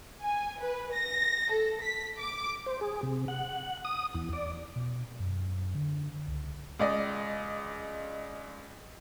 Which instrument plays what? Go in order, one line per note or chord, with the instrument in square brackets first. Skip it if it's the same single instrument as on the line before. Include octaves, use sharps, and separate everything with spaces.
[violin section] G#5
B4
A#6
A4
B6
D6
[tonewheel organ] C5
G#4
C3
F#5
D#6
E2
D5
[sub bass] B2
F#2
D3
C#2
[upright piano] C#2 D5 D#5